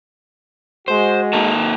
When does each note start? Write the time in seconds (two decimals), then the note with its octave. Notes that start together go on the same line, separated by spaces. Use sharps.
0.88 G#3 F#4 C5
1.33 A#3 D#4 A4